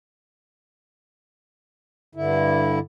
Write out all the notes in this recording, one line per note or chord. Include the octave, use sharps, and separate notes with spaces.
G2 D3 E4